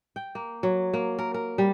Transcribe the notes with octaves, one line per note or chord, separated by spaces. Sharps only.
G5
A#3
F#3
A#3
A#4
A#4
G3